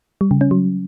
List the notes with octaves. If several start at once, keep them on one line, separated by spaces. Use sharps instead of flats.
G3
C#3
C#4
F#3